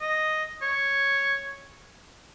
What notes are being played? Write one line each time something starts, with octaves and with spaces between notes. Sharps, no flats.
D#5
C#5